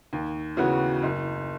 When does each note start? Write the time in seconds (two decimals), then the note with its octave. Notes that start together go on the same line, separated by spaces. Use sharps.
0.13 D#2
0.57 C#3 E3 B3 F#4
1.03 F#1